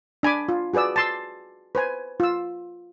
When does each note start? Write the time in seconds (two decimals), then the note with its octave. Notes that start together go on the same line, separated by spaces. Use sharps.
0.23 D4 G#5 B5 D6
0.49 F4
0.74 F#4 G#4 B4 D5 E6
0.96 A5 C6 E6
1.75 B4 C5 G#5
2.20 F4 E6